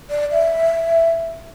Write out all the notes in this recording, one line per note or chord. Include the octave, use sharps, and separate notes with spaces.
D5
E5